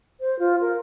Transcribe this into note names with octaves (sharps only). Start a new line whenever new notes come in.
C5
F4
A#4